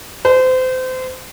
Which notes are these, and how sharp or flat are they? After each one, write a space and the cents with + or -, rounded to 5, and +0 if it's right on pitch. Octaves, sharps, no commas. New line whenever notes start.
C5 -30